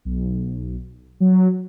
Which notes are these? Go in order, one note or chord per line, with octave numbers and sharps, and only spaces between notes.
B1
F#3